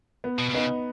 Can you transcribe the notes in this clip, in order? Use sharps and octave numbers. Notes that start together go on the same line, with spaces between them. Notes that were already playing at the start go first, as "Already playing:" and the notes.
B3
B2
B2
C#3 B3 D#4